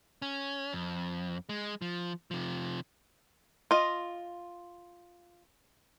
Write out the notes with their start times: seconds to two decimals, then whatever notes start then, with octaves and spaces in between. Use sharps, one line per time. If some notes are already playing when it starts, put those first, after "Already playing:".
0.22 C#4
0.73 F2
1.49 G#3
1.82 F3
2.31 C3 F3
3.71 F4 D#5